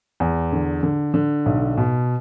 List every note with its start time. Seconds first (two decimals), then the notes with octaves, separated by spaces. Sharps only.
0.20 E2
0.52 D3
0.83 D3
1.14 D3
1.46 B1
1.77 B2